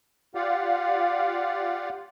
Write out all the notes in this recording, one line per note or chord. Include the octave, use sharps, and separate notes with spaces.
F4 G4 D5 F5 F#5